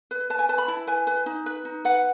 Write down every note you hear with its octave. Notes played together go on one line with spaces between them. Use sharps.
B4
B4 A5
G#5
B4 A5
B5
E4 A5
B4 G#5
B4
D#4
B4
D#4
B4 F#5